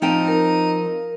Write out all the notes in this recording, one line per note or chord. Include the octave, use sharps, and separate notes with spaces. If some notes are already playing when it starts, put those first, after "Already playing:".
F3 C4 D#4 G5
A#4